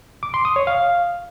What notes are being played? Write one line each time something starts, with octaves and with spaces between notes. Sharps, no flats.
D6
C6
D#6
C#5
F5